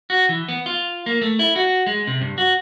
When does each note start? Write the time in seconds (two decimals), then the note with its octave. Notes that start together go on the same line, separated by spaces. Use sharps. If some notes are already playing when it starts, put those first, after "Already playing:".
0.10 F#4
0.29 E3
0.48 B3
0.66 F4
1.06 A#3
1.22 A3
1.39 E4
1.56 F#4
1.86 G#3
2.07 C3
2.21 G2
2.38 F#4